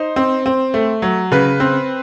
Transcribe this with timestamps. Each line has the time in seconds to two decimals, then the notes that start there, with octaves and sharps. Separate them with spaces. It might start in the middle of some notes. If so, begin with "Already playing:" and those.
Already playing: D#4 C5
0.16 C4
0.46 C4
0.74 A3
1.02 F#3
1.32 C#3 B4
1.60 C4